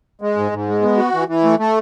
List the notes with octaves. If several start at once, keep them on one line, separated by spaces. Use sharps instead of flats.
G#3
G#2
G#2
G#3
B3
F#4
E3
E3
A3
A3